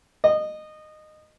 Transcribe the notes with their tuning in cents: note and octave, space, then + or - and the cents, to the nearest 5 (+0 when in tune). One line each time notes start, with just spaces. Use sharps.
D#5 -20